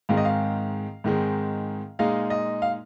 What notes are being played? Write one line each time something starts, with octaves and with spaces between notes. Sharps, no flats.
G#2 D#3 G#3 C4 F5
D#5
F5
G#2 D#3 G#3 C4
A#2 G#3 D#4 F5
D#5
F5